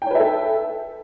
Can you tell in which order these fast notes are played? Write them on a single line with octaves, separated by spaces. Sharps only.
G5 C#5 B4 E5 A4